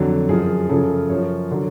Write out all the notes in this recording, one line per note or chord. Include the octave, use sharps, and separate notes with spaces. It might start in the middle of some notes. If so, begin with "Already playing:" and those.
Already playing: F2 D3 F#3
F#2 F3 G#4
F#2 C#3 F3 A4
F#2 F3 C#5
D3 F#3